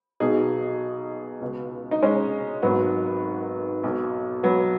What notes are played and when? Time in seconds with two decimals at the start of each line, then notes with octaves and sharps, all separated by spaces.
0.20 B1 B2 D#4 G#4
1.41 C#2 B2
1.91 D#4
2.02 G#3 C#4
2.62 G#1 G#2 D#3 F#3 B3
3.83 B1 B2
4.43 F#3 B3